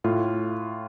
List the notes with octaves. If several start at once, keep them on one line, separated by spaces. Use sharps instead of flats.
A2 F4